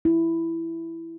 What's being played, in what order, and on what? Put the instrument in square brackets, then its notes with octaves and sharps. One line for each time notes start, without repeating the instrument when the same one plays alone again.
[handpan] E4